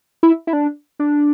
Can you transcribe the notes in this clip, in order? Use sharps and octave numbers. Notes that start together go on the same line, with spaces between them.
E4
E4
D4
D4